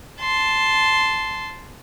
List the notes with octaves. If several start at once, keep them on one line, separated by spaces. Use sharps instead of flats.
A5 C6